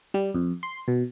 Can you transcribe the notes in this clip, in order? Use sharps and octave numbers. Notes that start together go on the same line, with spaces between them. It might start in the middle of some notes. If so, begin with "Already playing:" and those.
G3
F2
C6
B2